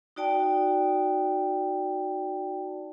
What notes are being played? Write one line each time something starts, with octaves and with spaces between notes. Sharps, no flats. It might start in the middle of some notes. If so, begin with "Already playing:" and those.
D#4 F#4 D5 G5 A5